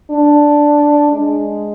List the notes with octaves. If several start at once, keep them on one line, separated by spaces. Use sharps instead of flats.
D4
G#3